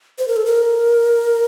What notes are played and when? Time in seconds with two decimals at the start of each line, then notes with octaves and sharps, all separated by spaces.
0.19 C5
0.28 A#4
0.36 A4
0.46 A#4